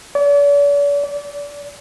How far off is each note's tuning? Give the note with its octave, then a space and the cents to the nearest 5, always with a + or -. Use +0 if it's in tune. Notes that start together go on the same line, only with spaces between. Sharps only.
D5 -45
D5 -25